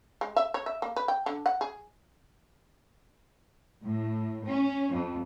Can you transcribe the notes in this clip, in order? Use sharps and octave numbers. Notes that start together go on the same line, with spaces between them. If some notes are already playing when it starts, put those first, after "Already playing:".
G#3
E5
C#5
E5
A#3
B4
G5
D3
F#5
G#4
A2
C#4
F2